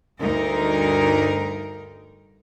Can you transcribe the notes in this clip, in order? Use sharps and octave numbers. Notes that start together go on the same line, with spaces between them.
D2 G2 D#4 A#4